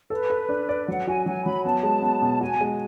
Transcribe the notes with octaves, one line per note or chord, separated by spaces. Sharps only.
A4 B4
A4
D4
D5
F#3 F#5
F#4 G#5
F#3 G#5
F#3 B5
B3 A5
G#3
B3
B2
F#4 G#5
G#3